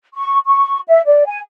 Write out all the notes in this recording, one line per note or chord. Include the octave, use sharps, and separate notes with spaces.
C#6
C#6
E5
D5
G#5